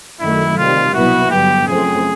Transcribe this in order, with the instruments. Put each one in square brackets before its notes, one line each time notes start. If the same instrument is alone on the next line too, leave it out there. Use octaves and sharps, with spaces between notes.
[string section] F#2 D#3 F#3 A3 [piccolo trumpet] E4
[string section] C3 D#3 G3 [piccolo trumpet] F4
[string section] C2 B2 F#3 B3 E4 [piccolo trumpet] F#4
[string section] G2 D3 F#3 B3 [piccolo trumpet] G4
[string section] F#2 C#3 F3 A3 C4 [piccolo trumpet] G#4